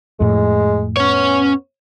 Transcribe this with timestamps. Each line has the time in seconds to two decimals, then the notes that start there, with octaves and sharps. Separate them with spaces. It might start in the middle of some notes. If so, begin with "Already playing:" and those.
0.20 F2 A2 G#3
0.97 B3 C#4 C#5